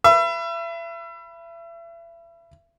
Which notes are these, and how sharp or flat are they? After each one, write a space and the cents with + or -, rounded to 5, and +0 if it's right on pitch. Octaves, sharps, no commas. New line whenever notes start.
B4 +0 E5 +35